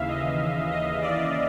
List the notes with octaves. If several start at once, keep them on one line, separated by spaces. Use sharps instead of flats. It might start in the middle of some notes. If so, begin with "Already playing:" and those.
Already playing: D#2 C#3 E3 E5 F5
D#5
D#5
D5